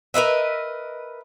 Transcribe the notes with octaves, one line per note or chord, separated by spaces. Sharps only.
A#4 B4 D#5 E5